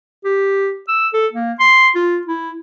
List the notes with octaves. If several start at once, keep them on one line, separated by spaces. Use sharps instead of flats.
G4
E6
A4
A#3
C6
F4
E4